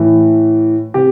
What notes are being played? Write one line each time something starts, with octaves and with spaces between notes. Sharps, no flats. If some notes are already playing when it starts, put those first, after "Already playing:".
Already playing: A2 E3
C3 G4